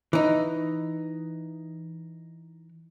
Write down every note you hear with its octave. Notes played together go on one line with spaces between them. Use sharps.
E3 D#4